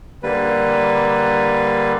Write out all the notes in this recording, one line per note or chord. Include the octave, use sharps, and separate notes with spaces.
D3 G3 A#3 B4